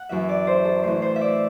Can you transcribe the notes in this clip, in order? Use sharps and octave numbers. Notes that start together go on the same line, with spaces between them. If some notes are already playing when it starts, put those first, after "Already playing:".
Already playing: F#5
F#2 E3 E5
D5
C5
A4
A2 E3 C5
C5
E5
D5